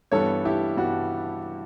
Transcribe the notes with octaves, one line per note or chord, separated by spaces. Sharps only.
G2 E3 G3 B3 A4 C#5
E4 G4
G2 E3 G3 B3 F#4